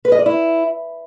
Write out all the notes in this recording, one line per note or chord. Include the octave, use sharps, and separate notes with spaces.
B4
D#5
D5
E4